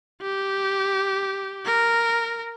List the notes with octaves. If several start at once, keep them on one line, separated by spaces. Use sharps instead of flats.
G4
A#4